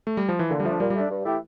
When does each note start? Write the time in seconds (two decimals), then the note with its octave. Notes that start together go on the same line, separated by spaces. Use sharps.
0.07 A3
0.17 G3
0.29 F3
0.39 E3
0.50 A#2 D3
0.60 G3
0.65 F3 A3 D4
0.80 A#2 G3
0.90 G3
0.96 A3 D4
1.10 G2
1.25 E3 A3 E4 G4